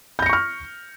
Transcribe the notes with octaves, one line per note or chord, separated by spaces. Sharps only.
C#6 F6 G6 A#6 C#7